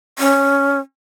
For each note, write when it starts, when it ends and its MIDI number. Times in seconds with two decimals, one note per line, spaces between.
0.19 0.79 61